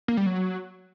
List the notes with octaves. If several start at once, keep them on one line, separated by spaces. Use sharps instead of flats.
A#3
G3
F#3